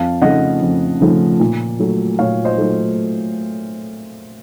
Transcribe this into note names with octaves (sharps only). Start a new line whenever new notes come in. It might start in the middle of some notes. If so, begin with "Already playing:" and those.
Already playing: F2 F5 A5
C#3 F3 A3 D#5 F#5
F2
C#3 F3 A3
A#2
F#3 A3
A#2 C#5 F5
C5 D#5
F#3 A3